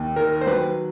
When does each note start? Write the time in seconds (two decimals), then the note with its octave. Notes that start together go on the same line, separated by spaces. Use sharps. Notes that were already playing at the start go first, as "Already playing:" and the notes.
Already playing: D#2
0.16 D#3 A#4
0.41 C5
0.47 F#3 B4